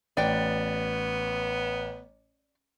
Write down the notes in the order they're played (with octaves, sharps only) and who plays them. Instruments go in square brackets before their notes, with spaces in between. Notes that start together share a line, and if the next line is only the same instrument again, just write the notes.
[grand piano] A1 [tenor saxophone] B3 [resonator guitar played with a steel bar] D5 G5